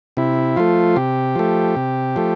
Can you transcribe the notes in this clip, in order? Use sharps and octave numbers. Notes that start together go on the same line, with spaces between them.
C3 E4
F3 A3 F4
C3 G4
F3 A3
C3
F3 A3